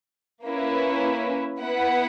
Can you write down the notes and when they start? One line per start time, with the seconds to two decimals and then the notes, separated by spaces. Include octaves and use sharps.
0.45 A#3 C#4 E4 B4
1.59 B3 E4 B4 F#5